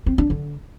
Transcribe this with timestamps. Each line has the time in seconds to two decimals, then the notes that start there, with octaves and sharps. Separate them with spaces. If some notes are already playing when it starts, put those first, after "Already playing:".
0.06 C4
0.18 D4
0.30 D3